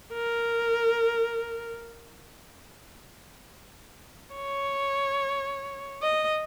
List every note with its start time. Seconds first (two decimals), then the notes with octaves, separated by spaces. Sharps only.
0.13 A#4
4.35 C#5
6.03 D#5